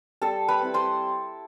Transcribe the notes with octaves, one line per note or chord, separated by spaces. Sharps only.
G3 A4 A5
B4 B5
C4 E4
C5 C6